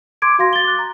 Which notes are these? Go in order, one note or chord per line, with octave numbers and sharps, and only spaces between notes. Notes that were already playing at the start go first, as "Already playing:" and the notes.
C6 D6 G#6 D7
F#4 F5 C6 A#6
A6 G7
D6 F#6
A#5